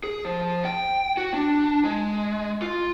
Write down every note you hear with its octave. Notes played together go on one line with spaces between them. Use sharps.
G#4
F3
G5
F#4
D4
G#3
F4